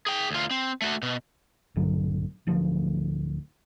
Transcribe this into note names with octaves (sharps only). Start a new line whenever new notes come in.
G#4 G5
D2 F4
C4
A3 F#4
B2
A#1 G2 D3 F#3
D1 D2 F3